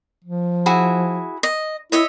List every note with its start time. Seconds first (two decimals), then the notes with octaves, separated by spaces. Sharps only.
0.24 F3
0.66 E4 F#4 G#4
1.43 D#5
1.92 E4 C#5 D#5 E5